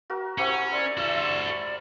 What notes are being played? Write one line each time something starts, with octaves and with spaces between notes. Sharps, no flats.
F#4 A#4
C#4 E4 G4 C5 F#5
D5 E5 C6
E4 F#4 A4 E5